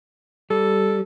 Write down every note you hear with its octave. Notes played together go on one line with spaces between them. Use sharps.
G3 A4